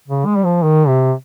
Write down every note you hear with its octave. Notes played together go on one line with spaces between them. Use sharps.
C#3
G#3
G3
F3
D#3
C3